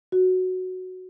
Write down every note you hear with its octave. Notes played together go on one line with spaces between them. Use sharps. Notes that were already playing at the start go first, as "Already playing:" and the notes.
F#4